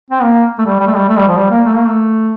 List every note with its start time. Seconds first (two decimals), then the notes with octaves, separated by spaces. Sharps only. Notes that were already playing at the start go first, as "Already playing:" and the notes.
0.11 C4
0.22 A#3
0.59 A3
0.66 G3
0.80 G3
0.87 A3
0.94 G3
1.08 A3
1.17 G3
1.28 F3
1.37 G3
1.51 A#3
1.66 A3
1.76 A#3
1.86 A3